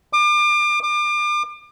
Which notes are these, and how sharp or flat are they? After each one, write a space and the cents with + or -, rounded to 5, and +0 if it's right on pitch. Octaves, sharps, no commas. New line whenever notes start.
D6 +35
D6 +35